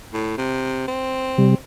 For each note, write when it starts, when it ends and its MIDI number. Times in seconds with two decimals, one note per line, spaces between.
0.13 0.35 45
0.38 0.87 48
0.88 1.55 60
1.38 1.55 48
1.38 1.55 55